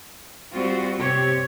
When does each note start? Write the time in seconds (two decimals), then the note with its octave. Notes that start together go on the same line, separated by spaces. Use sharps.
0.53 G3 C4 F4 F#4
0.99 C3 C4 G4 C#5